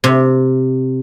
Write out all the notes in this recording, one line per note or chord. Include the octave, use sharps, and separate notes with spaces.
C3